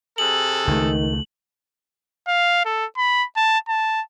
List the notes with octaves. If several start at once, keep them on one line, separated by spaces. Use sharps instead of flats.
C3 G#4 A4 F#7
C#2 D#3 A3
F5
A4
B5
A5
A5